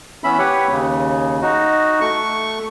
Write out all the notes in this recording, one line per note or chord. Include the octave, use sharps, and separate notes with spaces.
E3 B3 C#4 E5 B5
G4 B4 C#5 F#5
D#2 C#3
D#4 F#4
A3 C#6